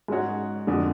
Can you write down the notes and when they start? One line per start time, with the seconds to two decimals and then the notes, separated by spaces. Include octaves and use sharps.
0.08 G#2 G#3 C#4 F#4 C#5
0.67 F2 D3 G#3 D4 F#4